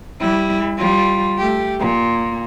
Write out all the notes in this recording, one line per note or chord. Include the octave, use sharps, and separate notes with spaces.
G3 E4
G3 F4
A3 G4
A#2